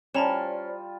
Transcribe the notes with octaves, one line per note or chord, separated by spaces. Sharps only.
G3 C#4 F4 C5 D5 A5 A#5 E7